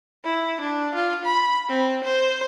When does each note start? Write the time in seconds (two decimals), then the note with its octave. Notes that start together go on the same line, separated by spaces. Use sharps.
0.24 E4
0.61 D4
0.95 F4
1.25 B5
1.69 C4
2.04 C5